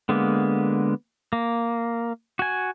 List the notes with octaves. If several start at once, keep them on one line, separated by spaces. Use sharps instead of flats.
D3 G#3 A#3 B3
A#3
F#4 G#5